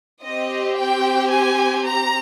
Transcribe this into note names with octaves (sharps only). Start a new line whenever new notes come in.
C4 G4 D#5
G5
G#5
A#5